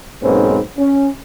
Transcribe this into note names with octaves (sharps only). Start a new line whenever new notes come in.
B1 G#2 A#3 C4 C#4 B4
C#4